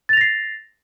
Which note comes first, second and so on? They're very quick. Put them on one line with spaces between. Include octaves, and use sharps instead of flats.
A6 F7 A#6 C7